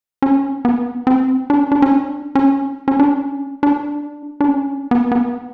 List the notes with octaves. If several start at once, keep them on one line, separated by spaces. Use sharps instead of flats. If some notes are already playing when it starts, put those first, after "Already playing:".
C#4
B3
C4
D4
C#4
D4
C#4
D4
C#4
C#4
D4
C#4
D4
D4
C#4
B3
B3